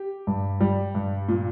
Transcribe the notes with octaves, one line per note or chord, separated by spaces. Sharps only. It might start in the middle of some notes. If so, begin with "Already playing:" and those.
Already playing: G4
G2
G3
G2
A#2